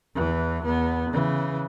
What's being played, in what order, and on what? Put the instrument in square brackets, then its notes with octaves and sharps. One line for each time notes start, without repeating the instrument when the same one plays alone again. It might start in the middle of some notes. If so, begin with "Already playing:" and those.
[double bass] E2 E3
E2 B3
C#3 E3